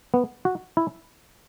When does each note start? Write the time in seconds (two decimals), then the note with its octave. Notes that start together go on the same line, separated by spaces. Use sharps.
0.14 B3
0.45 F#4
0.77 E4